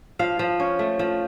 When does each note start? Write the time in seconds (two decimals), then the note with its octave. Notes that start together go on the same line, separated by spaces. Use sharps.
0.19 F3 F5
0.39 F3
0.60 C#4
0.79 A3
0.99 F3